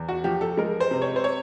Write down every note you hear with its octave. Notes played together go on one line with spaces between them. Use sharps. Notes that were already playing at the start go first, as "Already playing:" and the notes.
Already playing: E2
F#4
F3 G4
A4
G#3 A#4
C5
C3
C#5
C5
C#5